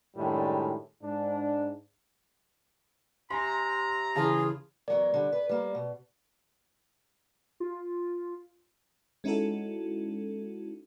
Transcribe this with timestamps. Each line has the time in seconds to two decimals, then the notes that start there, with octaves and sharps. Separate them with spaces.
0.16 F#2 A2 D#3 G3 G#3 D4
1.02 G#2 D4
3.30 C3 G#5 A#5 C6
4.16 C#3 E3 F4 G#4 A5
4.88 E2 F#3 A#4 D5
5.14 D3 G3
5.32 B4
5.49 G3 A#3
5.75 B2
7.60 F4
9.24 G#3 C#4 D#4 E4 F#4 A4